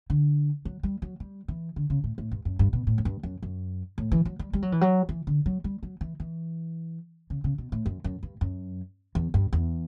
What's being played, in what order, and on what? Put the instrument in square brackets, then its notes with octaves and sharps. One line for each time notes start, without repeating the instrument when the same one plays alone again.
[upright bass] D3
F#3
G3
F#3
G3
E3
D3
C#3
A2
A2
G2
F#2
G2
B2
A2
F#2
G2
F#2
F#2
A2
E3
F#3
G3
G3
F#3
E3
F#3
E3
D3
F#3
G3
F#3
E3
E3
C#3
C#3
B2
A2
F#2
F#2
G2
F#2
E2
G2
E2